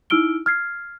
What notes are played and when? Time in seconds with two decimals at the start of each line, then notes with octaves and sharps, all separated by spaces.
0.10 D#4 E4 E6 F6 D7 G7
0.46 F6 G#6 C7